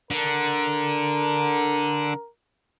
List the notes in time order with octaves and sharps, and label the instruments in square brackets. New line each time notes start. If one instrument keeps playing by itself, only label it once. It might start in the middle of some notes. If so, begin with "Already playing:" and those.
[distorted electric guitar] D3 [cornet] A#4